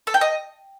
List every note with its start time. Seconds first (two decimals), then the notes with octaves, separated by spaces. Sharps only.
0.07 A4
0.14 G5
0.21 D#5